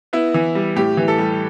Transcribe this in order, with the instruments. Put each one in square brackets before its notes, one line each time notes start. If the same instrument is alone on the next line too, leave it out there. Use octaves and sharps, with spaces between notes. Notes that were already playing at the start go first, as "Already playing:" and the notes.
[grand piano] B3 E4
E3
G3
A2 G4
E3
A4
G3